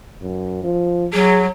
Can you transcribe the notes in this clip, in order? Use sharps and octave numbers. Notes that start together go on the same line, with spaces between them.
F#2
F3
F#3 G#4